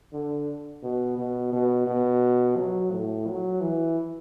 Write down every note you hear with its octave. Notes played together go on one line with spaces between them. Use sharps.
D3
B2
B2
B2
B2
F#3
A2
F#3
E3